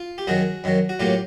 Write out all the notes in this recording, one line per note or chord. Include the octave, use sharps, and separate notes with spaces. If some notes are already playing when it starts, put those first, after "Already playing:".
Already playing: F4
G4
F#2 D#3 F#3 F#4 G#4
F#2 D#3 F#3
F#4
A2 F#3 A#3 F4 G4